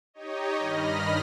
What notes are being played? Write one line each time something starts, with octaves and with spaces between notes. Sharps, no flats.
D#4 G4 C#5 D#5
G2 D#3 D#5 B5 F6 A#6